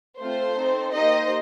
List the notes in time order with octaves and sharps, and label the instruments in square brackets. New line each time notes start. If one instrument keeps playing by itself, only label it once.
[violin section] A3 C4 F4 A4 C5
C4 D#4 A4
A#3 D#4 G4 C5 D#5